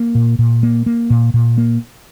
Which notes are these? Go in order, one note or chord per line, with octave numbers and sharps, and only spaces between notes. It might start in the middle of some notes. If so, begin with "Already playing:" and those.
Already playing: A#3
A#2
A#2
A#3
A#3
A#2
A#2
A#3